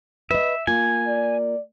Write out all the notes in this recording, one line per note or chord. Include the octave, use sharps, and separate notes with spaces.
B4 D#5 E5
A#3 F4 G#5
D5